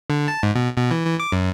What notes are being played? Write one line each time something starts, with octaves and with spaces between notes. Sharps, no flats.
D3
A5
G#2
B2
B2
E3
E3
D6
F#2